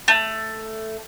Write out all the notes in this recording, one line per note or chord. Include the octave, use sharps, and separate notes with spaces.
A3